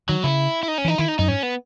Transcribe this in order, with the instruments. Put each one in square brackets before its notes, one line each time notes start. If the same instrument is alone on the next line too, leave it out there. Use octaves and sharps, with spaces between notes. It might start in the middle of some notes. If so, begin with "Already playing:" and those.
[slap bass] D#3 [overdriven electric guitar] F#3
[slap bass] C#3 [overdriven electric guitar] E4
[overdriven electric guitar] E4
D#4
C#4
[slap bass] E3 [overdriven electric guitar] D#4
[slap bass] D#3 [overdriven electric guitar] E4
[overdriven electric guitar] D#4
[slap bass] F#2 [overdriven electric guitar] D#4
[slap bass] G#2 [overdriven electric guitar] C#4
[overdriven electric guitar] B3